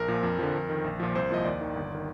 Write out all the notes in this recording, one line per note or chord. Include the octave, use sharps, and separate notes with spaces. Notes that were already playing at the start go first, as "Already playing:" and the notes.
Already playing: A#1 A#4
A#2 F3
F2
D3 F3
F2
D#3
A#1
A#2 F3
C2 C5
A#2 F3 D#5
D#2 D5
D#3
G1
D#3